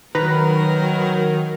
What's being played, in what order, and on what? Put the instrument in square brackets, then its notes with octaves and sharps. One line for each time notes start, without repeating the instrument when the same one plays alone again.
[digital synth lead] D#3 [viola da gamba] F#3 A#4 [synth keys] B4 A#5